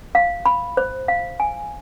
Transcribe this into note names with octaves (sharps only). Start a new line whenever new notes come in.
F5
B5
C5
F5
G#5